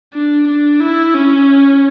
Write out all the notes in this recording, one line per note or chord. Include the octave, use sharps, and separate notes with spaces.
D4
D4
E4
C#4